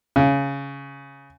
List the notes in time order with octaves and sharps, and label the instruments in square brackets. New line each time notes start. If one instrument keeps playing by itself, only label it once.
[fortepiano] C#3